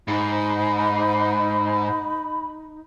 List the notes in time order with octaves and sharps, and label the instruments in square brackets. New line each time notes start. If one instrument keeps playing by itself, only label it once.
[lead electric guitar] G#2 [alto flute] D#4 [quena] B5